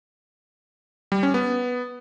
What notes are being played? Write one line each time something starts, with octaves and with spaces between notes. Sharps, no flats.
G3
C#4
B3